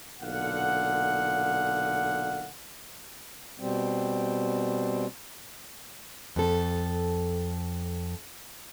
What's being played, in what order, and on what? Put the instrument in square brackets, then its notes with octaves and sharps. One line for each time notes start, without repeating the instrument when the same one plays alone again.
[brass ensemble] B1 A#2 D3 F5 F#5
[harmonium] B2 G3 C4
[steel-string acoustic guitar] F2 A4